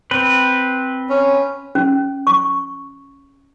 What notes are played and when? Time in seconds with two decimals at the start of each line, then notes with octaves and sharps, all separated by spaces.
0.11 C4 B4
1.10 C#4
1.75 C#4
2.27 C#6